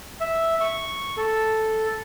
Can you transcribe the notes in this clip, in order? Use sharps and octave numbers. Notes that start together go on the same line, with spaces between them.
E5
C#6
A4